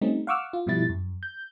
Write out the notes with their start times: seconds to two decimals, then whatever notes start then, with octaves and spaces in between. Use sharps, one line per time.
0.01 G3 A3 C4 C#4 D#4
0.27 F5 F#5 C#6 D6 E6 F6
0.53 F4
0.66 G2 B2 F3 G3 E4 A6
0.89 F#2
1.23 G6